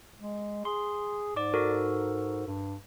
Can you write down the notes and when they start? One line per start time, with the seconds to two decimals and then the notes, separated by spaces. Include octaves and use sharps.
0.20 G#3
0.65 G#4 C6
1.36 G#2 D5 D6
1.54 F#4 A4 A#4
2.47 G2